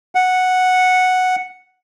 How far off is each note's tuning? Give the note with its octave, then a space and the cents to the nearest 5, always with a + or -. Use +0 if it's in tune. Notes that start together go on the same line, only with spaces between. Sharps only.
F#5 -5